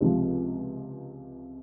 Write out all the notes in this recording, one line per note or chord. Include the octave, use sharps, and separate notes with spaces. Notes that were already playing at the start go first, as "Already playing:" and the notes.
C#2 C3 F3